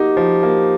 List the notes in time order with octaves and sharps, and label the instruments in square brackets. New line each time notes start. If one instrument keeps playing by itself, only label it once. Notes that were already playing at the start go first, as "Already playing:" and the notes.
Already playing: [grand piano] A#3 D#4 F#4 [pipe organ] G4
[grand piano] F3
A#3